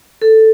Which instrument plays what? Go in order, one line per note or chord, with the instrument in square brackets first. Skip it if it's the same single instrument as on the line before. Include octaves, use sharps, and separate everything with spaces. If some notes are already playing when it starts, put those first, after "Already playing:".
[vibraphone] A4